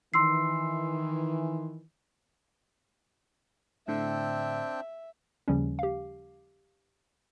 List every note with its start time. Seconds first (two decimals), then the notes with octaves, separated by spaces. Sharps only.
0.14 D#3 E3 C6 E6 C7
3.88 A2 D3 C4 D4 E5 G5
5.48 D#2 C#3 F3 G3 C#4
5.79 G4 F5